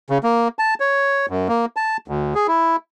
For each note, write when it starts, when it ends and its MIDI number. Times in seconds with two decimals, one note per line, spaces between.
0.10 0.18 49
0.23 0.48 58
0.59 0.74 81
0.80 1.26 73
1.29 1.48 42
1.49 1.66 58
1.76 1.97 81
2.08 2.34 38
2.35 2.47 68
2.48 2.76 64